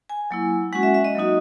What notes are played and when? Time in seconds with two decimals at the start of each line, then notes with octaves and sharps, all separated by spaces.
0.09 G#5
0.31 F#3 A#3 E4
0.73 G#3 C#4 F#4 F#5
0.83 E5
0.94 E5
1.04 D#5
1.15 F#3 A#3 D#4 F#4